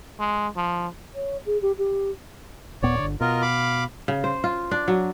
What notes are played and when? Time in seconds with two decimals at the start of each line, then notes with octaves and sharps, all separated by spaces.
0.20 G#3
0.56 F3
1.14 C#5
1.45 G#4
1.61 G4
1.78 G4
2.82 D#1 A#2 B3 C#5 D5
2.99 G1 D3
3.21 B2 F4 A#4 D#5
3.42 F5 B5 D6
4.08 C#3
4.24 C5
4.44 F4
4.71 D4
4.88 F#3